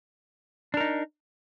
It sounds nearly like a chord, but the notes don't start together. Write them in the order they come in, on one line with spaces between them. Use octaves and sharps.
D4 A#4 D#4